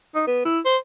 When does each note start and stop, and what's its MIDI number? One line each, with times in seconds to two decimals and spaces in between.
0.15 0.24 63
0.27 0.40 59
0.45 0.60 64
0.65 0.77 72